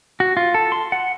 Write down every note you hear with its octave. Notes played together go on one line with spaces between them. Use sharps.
F#4
F4
A4
C6
F#5